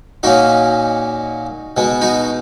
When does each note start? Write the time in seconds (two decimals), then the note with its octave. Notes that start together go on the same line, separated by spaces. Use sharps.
0.23 A#2 A#3 C#4 D#4 F#4
1.77 B2 G#3 B3
2.01 D#4 F#4